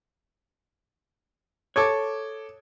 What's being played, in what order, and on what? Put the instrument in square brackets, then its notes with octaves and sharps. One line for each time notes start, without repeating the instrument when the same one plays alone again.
[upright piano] A4 D6 G#6 [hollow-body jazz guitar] C#5